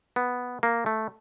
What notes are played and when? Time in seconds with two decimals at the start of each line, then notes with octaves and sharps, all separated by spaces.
0.16 B3
0.63 A#3
0.86 A3